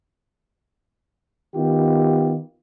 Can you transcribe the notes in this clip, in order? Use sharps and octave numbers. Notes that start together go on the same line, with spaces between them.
D#3 B3 F4 G4